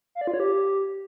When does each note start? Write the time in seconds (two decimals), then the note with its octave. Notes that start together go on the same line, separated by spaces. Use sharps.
0.15 F5
0.21 D5
0.27 F4
0.34 C#5
0.40 G4